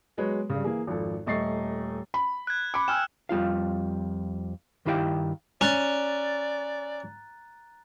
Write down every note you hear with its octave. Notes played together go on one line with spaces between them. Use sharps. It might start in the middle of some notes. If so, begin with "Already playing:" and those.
F#3 G#3 B3 B4 C#5
G2 C#3
E3 A#3 G#4
G#1 F2 A4
D#1 A3 D#5 C#6 A6 C7
B5
F#6 G#6
B5 D6 C#7
G5 G#5 E6 F6 E7
F2 G3 F4 F5
G2 D#3 E4 G4 F5 G5
C#4 D5 A#5 F#6 A6